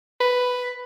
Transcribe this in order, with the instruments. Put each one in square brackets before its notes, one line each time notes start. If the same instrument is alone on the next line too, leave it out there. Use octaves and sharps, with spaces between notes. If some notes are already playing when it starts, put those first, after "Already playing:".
[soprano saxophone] B4